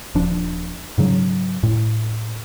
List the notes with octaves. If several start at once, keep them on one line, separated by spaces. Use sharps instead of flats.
D#1 F3 D4
G#2 C#3 F#3
A2